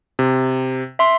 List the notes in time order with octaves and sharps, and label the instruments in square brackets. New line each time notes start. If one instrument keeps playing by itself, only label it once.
[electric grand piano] C3
[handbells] E5 C6